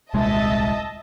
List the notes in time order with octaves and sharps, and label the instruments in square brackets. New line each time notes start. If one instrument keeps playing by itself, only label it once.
[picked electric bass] D#1 C2 G#3 [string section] D#5 E5 A5